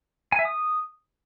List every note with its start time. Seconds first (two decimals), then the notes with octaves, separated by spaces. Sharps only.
0.32 G#5
0.39 E5
0.45 D#6